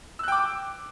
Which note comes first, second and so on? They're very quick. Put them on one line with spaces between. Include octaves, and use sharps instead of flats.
E6 F#6 G5 D6